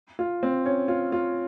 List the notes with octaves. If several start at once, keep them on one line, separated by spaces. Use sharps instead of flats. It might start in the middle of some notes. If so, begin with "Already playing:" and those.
F4
C4
C#4
F4
F4